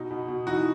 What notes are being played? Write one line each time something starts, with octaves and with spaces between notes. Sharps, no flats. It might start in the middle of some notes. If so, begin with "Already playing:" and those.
Already playing: B2 D#4
B2
B2
E3 D#4 F#4